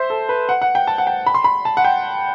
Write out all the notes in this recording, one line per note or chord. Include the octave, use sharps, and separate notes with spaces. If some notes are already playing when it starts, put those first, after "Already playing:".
Already playing: C5 E5
A4
B4
F#5
F#5
G5
A5
F#5
G5
B5
C6
B5
A5
F#5
G5